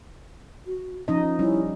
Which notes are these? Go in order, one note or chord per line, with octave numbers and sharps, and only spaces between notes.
F#4
F3 C#4 D#4 D#5
G3 C#4 E4